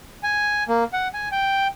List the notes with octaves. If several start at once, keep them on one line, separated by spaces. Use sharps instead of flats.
G#5
A#3
F#5
G#5
G5